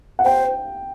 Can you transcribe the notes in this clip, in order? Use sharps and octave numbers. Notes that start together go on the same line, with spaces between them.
F#5
C5 G5